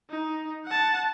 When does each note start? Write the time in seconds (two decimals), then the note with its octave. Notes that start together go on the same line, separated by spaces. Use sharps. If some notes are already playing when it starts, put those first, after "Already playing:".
0.10 D#4
0.66 F#5 A5